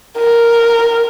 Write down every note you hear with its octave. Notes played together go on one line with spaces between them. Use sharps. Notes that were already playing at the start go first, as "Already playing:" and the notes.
A#4